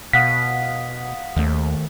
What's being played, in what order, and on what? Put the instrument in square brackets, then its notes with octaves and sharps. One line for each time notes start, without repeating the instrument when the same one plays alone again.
[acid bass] B2 [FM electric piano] F5 F#5 D#6 [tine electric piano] B6
[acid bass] D#2 [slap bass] D#3 A3